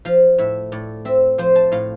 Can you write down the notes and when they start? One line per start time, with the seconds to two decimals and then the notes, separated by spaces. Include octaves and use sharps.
0.05 F3 F5
0.38 A2 E5
0.72 A2 D5
1.05 C4 E5
1.38 F3 C5
1.56 A5
1.72 A2 F5